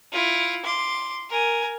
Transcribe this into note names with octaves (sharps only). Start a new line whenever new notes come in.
E4 F4
C6 D6
A#4 G#5